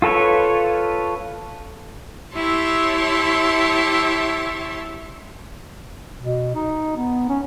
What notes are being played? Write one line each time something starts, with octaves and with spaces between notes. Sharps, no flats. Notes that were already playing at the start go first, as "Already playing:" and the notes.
F4 A4 B4 C#5
E4 G4 C#5 E5 A5 C6
B2
D#4
B3
C#4